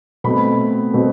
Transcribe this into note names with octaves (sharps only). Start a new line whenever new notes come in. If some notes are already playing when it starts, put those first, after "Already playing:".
B2 A3 C4 B5
B2 A3 C4